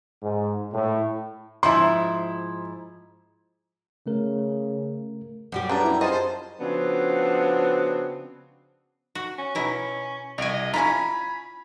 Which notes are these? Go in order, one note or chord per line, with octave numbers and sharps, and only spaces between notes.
G#2
A2
G#2 F3 E4 C6
C#3 A3 A#4
F#2 G3 G4
C#3 B3 D4 D5 A#5
E4
F4 G#4 C5 D#5 A5
C#3 F3 B3 C4 D4 F#4
F#4
C#4
B2 E4 A#4
C2 C#5 D#5 G#5 D7
C#4 E4 F4 G#5 A#5 B5